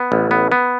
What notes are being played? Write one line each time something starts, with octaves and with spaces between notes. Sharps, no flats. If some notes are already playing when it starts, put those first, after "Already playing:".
Already playing: B3
A1
B3
B3